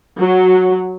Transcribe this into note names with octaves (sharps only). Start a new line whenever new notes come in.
F#3